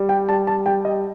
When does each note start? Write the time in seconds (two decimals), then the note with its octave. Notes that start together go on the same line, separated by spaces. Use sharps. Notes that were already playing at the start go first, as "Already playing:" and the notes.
Already playing: G3
0.09 G5
0.29 G3 A5
0.47 A5
0.66 G3 G5
0.85 D#5